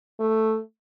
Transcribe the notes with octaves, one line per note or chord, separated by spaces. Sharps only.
A3